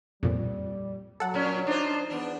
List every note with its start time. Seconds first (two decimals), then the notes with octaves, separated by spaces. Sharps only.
0.23 F2 A#2 G3
1.20 F#3 A4 F#5
1.34 A#2 C#4
1.67 D4 D#4 F4 C5
2.10 E2 B3 D4